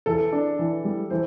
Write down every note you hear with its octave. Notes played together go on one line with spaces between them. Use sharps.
E3 A4
D4
E3
G3
E3 C5